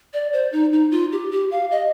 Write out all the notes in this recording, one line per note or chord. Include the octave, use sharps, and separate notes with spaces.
D5
C5
D#4
D#4
F4
G4
G4
F5
D#5